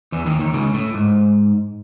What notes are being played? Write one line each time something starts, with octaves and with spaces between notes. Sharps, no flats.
E2 E3
D#2 D#3
D#2 D#3
C#2 C#3
A2
G#2